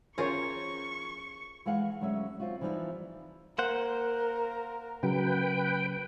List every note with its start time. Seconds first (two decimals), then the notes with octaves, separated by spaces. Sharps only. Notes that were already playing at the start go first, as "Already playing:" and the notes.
0.18 F3 C#4 F4 G#4 A#4 C5 C#5 C#6
1.66 E3 G#3 B4 F5 F#5
2.01 D2 F#3 G#3 C#4 E5
2.40 F#3 C4 F4 F#4
2.61 E3 F3 G3 B3 D#4 E4
3.58 A#3 A#4 C5 F#5
5.03 C#3 F#3 B4 G5